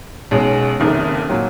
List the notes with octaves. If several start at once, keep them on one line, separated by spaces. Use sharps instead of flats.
B1 B2 G#3 C#4
F#1 F2 C3 D#3
A#2 F#3